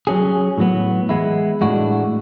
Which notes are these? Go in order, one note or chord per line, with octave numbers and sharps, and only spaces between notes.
F#3 C#4 G#4
A2 F#3 B3
E3 G#3 B3 E4
A2 G#3 D4 F#4